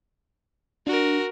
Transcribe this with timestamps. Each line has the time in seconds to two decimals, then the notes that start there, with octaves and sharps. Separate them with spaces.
0.87 D4 F#4 A#4